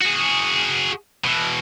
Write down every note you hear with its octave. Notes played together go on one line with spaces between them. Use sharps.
F#4 G#4
B2 E3